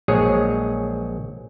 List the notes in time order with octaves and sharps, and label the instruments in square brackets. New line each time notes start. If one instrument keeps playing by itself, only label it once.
[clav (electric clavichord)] A#1 F#3 G#3 G#4 C#5